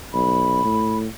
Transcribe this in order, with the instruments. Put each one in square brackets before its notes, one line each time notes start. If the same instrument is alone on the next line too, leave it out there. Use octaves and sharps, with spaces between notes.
[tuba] B1 [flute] B5
[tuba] A2